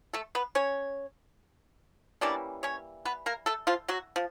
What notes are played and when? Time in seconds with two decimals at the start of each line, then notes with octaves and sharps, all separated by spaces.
0.13 A3 A4
0.35 B3 B4
0.55 C#4 C#5
2.21 E3 G3 A#3 C#4 D4 D5
2.63 C#4 C#5
3.05 B3 B4
3.26 A#3 A#4
3.46 A3 A4
3.67 F3 F4
3.88 F#3 F#4
4.16 F3